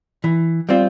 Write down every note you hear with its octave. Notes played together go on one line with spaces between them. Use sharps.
E3
G3 C4 F4